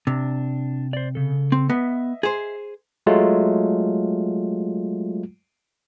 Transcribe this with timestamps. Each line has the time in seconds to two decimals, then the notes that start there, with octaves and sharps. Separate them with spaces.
0.07 C3 D4
0.93 C5 D5
1.15 C#3 A4
1.52 C4
1.70 B3 D#5 E5
2.23 G#4 C5
3.06 F#3 G#3 A3 F4